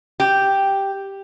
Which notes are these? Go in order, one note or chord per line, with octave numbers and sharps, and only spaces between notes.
G4